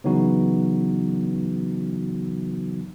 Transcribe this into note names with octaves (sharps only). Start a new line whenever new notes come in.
C#3 E3 F#3 B3 D#4 F#4